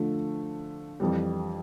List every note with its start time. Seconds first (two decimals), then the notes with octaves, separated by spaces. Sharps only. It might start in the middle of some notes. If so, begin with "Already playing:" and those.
Already playing: D3 F3 A3
1.00 F2 E3 G3